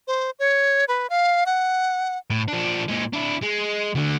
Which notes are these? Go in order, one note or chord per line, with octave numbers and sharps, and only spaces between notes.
C5
C#5
B4
F5
F#5
A2
F3 D4
A#2 G#3
D4 E4
G#3
D2 D3